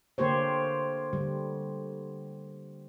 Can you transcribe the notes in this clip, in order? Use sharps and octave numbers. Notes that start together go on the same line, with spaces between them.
D3 A#3 G4 C5 C#5
D3 G3